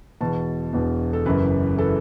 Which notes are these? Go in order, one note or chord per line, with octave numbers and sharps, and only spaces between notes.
E1 E2 B2 A5
E1 E2 B2
A4
F#1 F#2 E3 B4
E3 A4